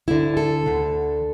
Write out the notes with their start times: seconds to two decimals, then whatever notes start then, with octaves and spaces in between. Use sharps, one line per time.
0.08 D2 D3 E4
0.37 A4
0.66 D2 D3